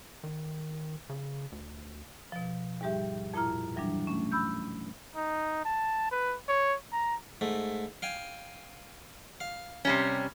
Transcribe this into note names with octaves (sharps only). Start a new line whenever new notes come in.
D#3
C#3
D2
B2 F3
D#2 G#2 G3 G4 E5
F2 A#2 E4 A#5 F6
E3 F#3 G3 D4
A3 C#4
B5 E6 G6
D#4
A5
B4
C#5
A#5
G#2 A3
F5 G5 G#5
F5
C3 G3 C#4 A#5